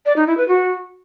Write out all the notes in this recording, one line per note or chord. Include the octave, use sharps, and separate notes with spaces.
D5
D#4
E4
B4
F#4